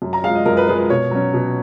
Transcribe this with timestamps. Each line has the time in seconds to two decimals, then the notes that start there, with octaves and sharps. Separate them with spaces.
0.02 F#2
0.13 A#5
0.24 F3 G#3 F5
0.35 D#5
0.46 F#2 A#4
0.57 B4
0.68 F3 G#3 B4
0.78 B4
0.90 B2 C#5
1.11 F#3 C#4
1.34 B2